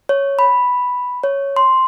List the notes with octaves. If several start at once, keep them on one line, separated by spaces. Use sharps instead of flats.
C#5
B5
C#5
C6